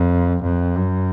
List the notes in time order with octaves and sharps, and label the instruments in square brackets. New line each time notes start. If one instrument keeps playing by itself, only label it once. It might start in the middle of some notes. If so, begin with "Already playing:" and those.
Already playing: [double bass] F2
F2
F#2